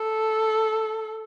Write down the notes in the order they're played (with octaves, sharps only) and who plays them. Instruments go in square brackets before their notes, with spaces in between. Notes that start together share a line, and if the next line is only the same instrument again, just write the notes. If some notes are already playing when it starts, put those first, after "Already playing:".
Already playing: [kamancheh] A4